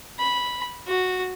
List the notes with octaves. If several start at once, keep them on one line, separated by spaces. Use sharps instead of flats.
B5
F#4